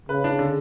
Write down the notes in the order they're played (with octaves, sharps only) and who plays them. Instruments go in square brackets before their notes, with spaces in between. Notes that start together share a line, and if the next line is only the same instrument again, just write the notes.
[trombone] C#3 [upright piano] B4
[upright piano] D4
D3